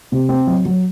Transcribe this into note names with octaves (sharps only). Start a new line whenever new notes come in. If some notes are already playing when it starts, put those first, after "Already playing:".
C3
C4
F#3
F#3